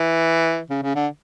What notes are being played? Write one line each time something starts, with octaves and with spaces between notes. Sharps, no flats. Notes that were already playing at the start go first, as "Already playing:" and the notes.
Already playing: E3
C#3
C#3
D3